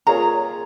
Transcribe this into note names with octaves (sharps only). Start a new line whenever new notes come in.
A#3 F4 G#4 C#5 A#5